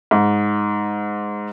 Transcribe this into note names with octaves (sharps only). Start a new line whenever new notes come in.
G#2